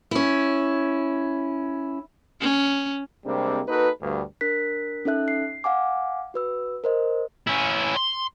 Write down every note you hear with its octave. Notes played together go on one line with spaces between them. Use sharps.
C#4 E4
C#4
C3 G3 G#3 A#3 C4 D4
A#3 D#4 F#4 A4 B4
D2 G2
D4 A#4 F#6 B6
C#4 D#4 A4 E5 F#6
C7
F5 F#5 G#5 D6
F#4 B4 E6
A#4 C5 D#5
C#4 E4
C6